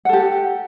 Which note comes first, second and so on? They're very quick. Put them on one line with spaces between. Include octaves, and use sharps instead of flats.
F#5 A4 G4